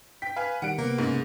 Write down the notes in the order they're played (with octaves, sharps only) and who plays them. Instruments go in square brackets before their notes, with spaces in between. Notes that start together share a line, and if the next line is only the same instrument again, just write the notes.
[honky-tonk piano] G5 B6
[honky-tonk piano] B4 G#5 [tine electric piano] F5
[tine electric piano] D#3 G3 [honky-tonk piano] F#5 C#7 D7
[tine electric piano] C3 B3 [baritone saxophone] A#3
[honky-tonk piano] G#2 C#3